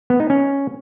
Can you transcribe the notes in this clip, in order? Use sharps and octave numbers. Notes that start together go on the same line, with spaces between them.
B3
D#4
C#4